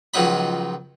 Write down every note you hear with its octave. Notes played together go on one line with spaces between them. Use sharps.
C#2 D#3 F3 F#3 D#4 B5